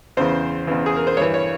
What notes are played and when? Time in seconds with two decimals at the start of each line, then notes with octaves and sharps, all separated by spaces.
0.17 E2 C#3 E3 C5
0.67 E2 C#3 E3
0.86 G#4
0.96 A#4
1.07 C5
1.17 G2 E3 C#5
1.34 C#5